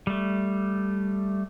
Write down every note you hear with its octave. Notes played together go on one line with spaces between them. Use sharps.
G3 A3